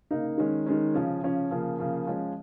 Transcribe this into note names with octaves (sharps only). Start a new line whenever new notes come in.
C#3 A#3 D#4
D#3 G#3 C#4
D#3 G#3 C#4
C#3 F3 C#4
C#3 F3 C#4
C#3 F3 A#3
C#3 F3 A#3
F3 G#3 C#4